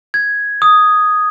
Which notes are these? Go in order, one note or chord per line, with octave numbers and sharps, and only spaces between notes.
G#6
D#6